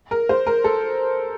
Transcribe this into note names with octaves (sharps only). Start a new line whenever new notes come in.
A#4
C5
A#4
A4